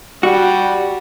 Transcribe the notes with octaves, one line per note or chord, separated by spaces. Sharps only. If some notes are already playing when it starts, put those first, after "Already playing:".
G3 F#4